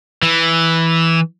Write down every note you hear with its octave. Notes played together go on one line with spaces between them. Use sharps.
E3